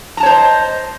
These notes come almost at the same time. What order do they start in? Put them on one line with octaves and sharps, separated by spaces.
A#5 A5 C#5 C5 D#5